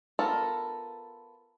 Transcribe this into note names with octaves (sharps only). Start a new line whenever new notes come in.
B3 F4 A4 A#4